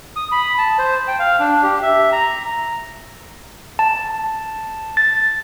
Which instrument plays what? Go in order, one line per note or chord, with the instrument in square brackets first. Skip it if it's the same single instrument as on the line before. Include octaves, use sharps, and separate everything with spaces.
[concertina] D#6
B5
A5
C5
G5
F5
D4
G4
E5
A#5
[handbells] A5
A6